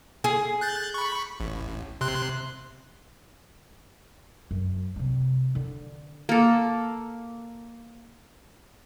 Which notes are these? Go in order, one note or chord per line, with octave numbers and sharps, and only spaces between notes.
G#4
F#6 G6 A6
B5 C#6
A1
C3 C6 F#6
F#2
C3 G3
D3
A#3 A4